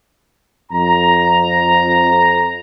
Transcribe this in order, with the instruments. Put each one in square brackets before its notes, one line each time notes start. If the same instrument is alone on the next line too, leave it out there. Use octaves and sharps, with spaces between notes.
[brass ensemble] F2 A#5